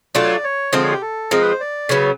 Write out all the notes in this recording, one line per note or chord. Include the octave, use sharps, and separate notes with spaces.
F#3 A3 D4 F4 D5
C#5
D5
C#5
D3 F3 G#3 C4 C5
C#5
G4
A4
F3 G#3 C4 A#4
B4
C5
D5
C#3 F#3 B3 C#5